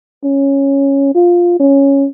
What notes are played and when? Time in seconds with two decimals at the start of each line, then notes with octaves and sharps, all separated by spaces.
0.24 C#4
1.15 F4
1.60 C#4